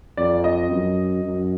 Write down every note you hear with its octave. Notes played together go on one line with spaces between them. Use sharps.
F2 D5
D#5
F#2
F#2